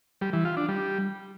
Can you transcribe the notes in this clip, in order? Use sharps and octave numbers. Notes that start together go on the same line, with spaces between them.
G3
E3
F4
D4
G3